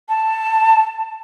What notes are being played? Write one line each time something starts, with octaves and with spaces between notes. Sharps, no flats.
A5